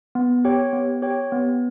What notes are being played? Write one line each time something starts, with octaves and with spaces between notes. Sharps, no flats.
B3
G4 C#5 G5
B3
G4 C#5 G5
B3